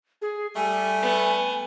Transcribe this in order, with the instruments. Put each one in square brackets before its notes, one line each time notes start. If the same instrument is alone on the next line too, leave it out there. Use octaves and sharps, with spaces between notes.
[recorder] G#4
[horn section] G3 A3 [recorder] G#5
[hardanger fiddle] B3